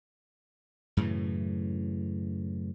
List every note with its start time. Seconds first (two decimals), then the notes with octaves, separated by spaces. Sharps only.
0.97 F#2 A2 C#3 E3